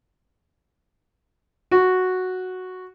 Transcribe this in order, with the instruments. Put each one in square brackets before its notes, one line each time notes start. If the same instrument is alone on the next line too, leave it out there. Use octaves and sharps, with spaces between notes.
[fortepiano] F#4